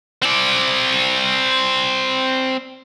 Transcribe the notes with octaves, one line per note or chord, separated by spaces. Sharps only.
C4 D5